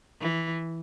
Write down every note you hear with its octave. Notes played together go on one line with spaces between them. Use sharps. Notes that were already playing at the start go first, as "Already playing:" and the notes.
E3